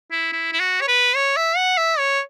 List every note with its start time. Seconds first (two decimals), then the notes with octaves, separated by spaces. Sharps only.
0.11 E4
0.33 E4
0.53 E4
0.60 F#4
0.81 C#5
0.88 B4
1.15 C#5
1.37 E5
1.57 F#5
1.78 E5
1.99 C#5